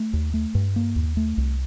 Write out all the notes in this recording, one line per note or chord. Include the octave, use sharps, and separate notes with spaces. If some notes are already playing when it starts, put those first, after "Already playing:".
Already playing: A3
D#2
A3
G2
A#3
D#2
A3
C2